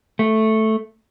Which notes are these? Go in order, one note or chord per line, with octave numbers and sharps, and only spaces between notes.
A3